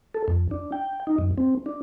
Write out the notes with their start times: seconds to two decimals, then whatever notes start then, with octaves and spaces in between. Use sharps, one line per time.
0.14 A4
0.28 F2
0.51 D4
0.72 G5
1.07 D#4
1.18 F#2
1.38 C4
1.66 D4